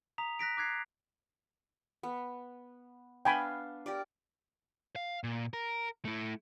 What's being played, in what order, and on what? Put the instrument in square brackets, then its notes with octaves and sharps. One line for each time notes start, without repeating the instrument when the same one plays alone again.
[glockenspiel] A#5 D#6 B6 F7
F#6 A#6 B6 D7
D6 F#6 G#6 C7
[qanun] B3
[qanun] B3 D4 F5 [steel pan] G5 G#5 B5
[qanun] G4 A#4 D5
[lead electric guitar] F5
A#2
A#4
A3 E4